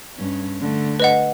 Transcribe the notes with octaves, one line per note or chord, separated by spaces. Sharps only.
G2 C#4
D3 A3
B4 D#5 F#5